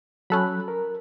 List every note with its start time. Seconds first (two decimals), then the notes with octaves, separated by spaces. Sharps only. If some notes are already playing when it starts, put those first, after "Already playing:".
0.30 F#3 C#4 A4 B5 F#6
0.68 A#4